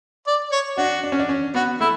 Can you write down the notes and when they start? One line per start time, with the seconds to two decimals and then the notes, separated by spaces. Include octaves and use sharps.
0.27 D5
0.52 C#5
0.78 D4 F#4
1.04 D4
1.12 C#4
1.20 D4
1.29 C#4
1.54 B3 F#4
1.80 A3 E4